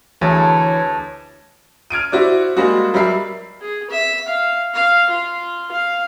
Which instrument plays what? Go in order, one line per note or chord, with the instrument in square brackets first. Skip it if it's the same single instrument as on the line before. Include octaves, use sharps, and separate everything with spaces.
[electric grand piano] D2 [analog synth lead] E3 [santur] G#4 E5 A5 [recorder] C#5
[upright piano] F6 G#6 D7 D#7
E4 F#4 C5 D5
G3 G#3 A#3 F#4
F#3 G3 A#4 E5 B5 C7
[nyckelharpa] G#4
E5
F5
F5
F4
F5